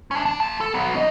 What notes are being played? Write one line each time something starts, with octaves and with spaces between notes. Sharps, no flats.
C#4 D4
D4
A#3 A5
A4
F#3 B3
D4 D#5